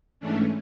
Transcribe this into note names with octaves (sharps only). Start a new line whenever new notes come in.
G#2 E3 A3 C#4 D4